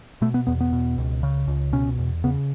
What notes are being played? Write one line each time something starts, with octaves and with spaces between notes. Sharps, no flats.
B2 A3
B3
E2 B3
B3
B2
C#2
C#3
C#2
B2 C#4
E2
C#3 B3